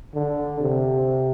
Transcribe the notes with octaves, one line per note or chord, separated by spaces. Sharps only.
D3
C3